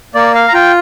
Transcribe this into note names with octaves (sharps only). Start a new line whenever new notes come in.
A#3 D5
F5
A#5
F4 G5